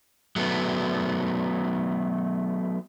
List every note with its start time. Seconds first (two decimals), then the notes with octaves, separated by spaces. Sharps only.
0.36 F#3 A3 B3